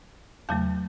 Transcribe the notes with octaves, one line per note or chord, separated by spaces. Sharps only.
E2 C#3 F#3 A3 A5